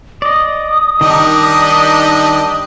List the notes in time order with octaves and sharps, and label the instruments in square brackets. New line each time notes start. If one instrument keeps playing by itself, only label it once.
[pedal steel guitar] D5 D#5 [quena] D#6
[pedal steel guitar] D#3 D#4 A#4 [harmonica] G3 D4 D#5